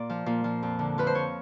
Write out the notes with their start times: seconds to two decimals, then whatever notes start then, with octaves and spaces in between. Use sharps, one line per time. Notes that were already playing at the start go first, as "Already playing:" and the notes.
Already playing: A#2 D5
0.10 F3
0.26 A#2
0.44 F3
0.63 F2
0.79 D3
0.98 F3 B4
1.07 C5
1.15 F3 C#5